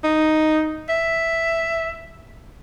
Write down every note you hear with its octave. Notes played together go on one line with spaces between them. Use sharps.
D#4
E5